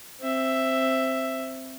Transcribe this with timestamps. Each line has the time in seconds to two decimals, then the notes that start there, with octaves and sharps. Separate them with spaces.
0.20 C4 E5